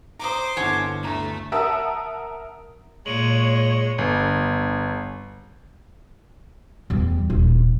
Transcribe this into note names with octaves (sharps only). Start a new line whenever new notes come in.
C5 A#5 D6 D#6
G1 E3 A4 C#5 F#5 G#5
D2 A3 A#5
A#4 E5 F#5 A5 D#6 E6
A#2 G#3 C#5 C#7 D#7 F#7
G1
E2 G3
D#1 F3